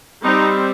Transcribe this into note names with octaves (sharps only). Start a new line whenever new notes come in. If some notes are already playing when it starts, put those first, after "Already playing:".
G3 C4 D#4